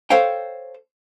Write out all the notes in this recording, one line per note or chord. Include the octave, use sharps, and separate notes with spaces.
A4 C5 C#5 F5 G5